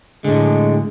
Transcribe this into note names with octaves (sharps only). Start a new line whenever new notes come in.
A2 D3 G#3